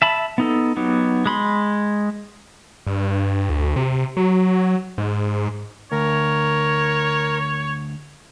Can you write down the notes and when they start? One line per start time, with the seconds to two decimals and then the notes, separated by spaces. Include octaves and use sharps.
0.02 E5 A5 B5
0.38 B3 D#4 A4
0.77 F#3 B3 D#4 G4
1.26 G#3 B5 C6
2.87 G2
3.50 D2
3.76 C3
4.17 F#3
4.98 G#2
5.92 D2 A#4 C#5